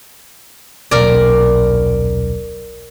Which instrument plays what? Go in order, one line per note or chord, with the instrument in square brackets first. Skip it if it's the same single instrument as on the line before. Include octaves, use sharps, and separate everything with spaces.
[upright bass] D#1 B1 [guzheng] A#4 D5